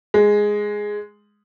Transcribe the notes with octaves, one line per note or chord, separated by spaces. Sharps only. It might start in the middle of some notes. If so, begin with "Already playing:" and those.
G#3